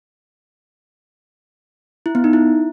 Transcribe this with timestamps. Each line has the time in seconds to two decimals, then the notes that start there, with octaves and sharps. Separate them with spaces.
2.06 E4
2.15 B3
2.24 D#4
2.33 E4